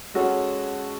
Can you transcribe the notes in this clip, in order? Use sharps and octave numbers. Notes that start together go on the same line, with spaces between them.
G#3 C#4 F#4 A4